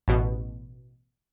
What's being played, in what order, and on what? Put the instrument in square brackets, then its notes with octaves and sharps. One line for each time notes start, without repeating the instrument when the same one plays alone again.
[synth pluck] A1 B2